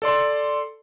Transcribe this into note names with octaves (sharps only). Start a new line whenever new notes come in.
A4 D5 C6